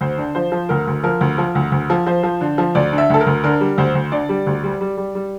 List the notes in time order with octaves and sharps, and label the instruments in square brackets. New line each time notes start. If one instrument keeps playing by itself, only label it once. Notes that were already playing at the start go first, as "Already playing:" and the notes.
[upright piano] D2 C5
D3
F3 C5
F3
D2 A#4
D2
F3 A#4
D2
F3
D2
D2
F3
F3 C5
F3
D3
F3
D2 D5
D3
E5
D2 A4
A#4
D2
D3 A#4
G3
D2 C5
D2
D3 D5
G3
D2
G3
G3
G3
G3